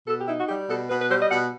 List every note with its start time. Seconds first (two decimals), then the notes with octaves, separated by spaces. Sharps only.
0.07 B2 A4
0.18 G4
0.28 D#4 E4
0.39 F#4
0.48 G3 G4
0.69 B2 A4
0.89 B2 B4
1.00 B4
1.10 G3 C5
1.21 D#5
1.30 B2 F#5